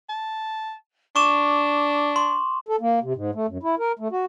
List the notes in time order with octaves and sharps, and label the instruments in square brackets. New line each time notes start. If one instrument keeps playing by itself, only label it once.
[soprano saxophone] A5
[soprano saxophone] D4 [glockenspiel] C#6 D6 E7
[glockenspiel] C6
[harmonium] A4
A#3
C3
G#2
A3
F#2
E4
A#4
A3
F#4